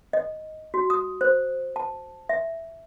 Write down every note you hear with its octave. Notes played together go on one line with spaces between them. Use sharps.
D#5
F#4
D#6
C5
A5
E5